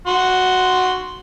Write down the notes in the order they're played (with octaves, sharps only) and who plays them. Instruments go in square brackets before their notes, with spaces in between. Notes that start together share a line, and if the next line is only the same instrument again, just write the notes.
[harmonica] F#4 C6